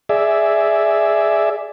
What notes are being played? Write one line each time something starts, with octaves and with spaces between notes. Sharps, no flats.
G#4 D5 E5